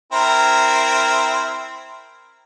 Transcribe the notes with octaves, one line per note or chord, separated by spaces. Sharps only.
C4 E4 A#4